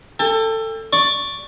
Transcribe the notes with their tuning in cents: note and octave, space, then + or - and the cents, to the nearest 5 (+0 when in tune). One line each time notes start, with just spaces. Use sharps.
A4 +20 G5 +40
D5 +0 C#6 +0